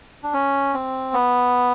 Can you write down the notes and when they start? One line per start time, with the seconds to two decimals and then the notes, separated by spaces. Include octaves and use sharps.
0.23 D4
0.33 C#4
0.74 C4
1.13 B3